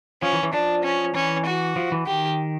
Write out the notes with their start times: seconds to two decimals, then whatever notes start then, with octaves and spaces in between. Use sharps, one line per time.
0.22 F3 C#4
0.33 E3
0.43 E3
0.53 F3 D4
0.84 C#4
1.14 E3 C#4
1.46 F#4
1.76 F3
1.92 E3
2.06 D#3 G4